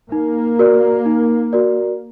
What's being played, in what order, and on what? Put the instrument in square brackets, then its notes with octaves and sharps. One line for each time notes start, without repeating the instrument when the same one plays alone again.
[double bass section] A#3 [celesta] D#4
[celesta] F#4 A#4 D5
D#4
F#4 A#4 D5